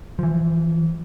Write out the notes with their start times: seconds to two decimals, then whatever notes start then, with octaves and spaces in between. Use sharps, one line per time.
0.19 E3 F3